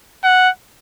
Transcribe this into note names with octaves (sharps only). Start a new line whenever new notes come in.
F#5